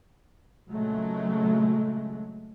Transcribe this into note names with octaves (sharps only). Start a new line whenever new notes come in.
A#2 C#3 F#3 G#3 A3